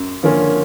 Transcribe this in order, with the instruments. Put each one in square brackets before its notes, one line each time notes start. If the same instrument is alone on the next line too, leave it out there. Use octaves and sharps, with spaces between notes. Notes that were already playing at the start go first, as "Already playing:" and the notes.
Already playing: [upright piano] F#2
D3 F3 A#3 C#4